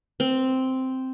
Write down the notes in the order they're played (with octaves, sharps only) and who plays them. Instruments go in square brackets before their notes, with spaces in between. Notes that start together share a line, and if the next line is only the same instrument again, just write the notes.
[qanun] C4